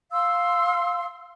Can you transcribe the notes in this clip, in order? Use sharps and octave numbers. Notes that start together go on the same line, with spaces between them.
F5 C6 E6